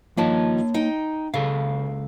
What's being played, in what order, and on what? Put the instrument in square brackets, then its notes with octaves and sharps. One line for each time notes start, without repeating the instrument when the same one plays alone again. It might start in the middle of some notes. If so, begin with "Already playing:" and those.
[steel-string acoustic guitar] G2 D#3 F3 [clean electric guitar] A#3 C#5 A5
[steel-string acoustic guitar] D#4 G5
[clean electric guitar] C#2 A4 F5 [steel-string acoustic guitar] C#3